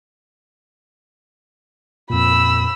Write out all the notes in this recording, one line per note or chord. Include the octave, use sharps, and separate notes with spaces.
F2 A#2 B5 E6